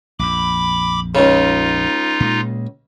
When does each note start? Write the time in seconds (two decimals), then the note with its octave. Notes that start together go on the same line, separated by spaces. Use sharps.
0.19 A#1 F2 B5 D6
1.15 C#2 C#3 D#4 F4
2.20 A#2 G#3